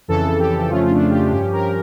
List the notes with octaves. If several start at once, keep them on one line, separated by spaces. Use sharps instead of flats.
F2 C#3 E3 A4
G4
F2 C#3 F3 A3 C#4 F4
D4
G4
G2 F3 C#4 G4
A#4